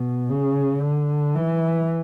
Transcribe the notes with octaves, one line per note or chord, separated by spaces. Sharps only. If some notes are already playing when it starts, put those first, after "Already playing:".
Already playing: B2
C#3
D3
E3